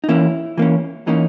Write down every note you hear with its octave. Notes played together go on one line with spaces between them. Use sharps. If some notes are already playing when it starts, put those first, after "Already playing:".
D#4
E3 A#3 C#4 E4
E3 A#3 C#4
E3 A#3 C#4 D#4